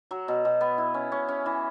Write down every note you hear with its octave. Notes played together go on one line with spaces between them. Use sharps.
F#3
B2
B2
B3
E4
C#4
C#4
C#4
E3